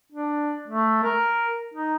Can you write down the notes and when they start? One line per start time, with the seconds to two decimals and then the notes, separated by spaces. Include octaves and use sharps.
0.13 D4
0.68 A3
1.03 A#4
1.74 D#4